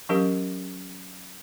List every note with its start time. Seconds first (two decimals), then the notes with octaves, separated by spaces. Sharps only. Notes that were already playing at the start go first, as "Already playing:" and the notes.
0.09 E3 F#3 C#4 G4 A#4 F5